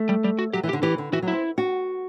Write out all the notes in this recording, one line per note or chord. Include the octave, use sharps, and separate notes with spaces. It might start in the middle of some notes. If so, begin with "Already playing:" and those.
Already playing: A3
G3
G3
F#4
F#3 G4
E3
G4
D3
E3 G4
D3
E3 F#4
F#3
C4 E4
F#4